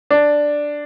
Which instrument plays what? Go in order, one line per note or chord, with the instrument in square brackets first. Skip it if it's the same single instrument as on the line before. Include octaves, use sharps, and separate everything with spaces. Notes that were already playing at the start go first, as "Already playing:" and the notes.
[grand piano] D4